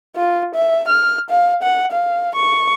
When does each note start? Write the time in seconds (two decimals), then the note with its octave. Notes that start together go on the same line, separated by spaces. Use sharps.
0.16 F4
0.55 E5
0.88 F6
1.30 F5
1.63 F#5
1.92 F5
2.35 C#6